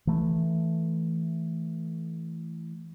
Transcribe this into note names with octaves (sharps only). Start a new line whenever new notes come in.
E3 A3